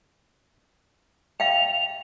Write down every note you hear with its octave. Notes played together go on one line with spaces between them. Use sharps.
F5 G5 F7